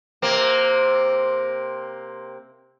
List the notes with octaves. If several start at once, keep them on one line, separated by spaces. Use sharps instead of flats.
C3 A#3 C4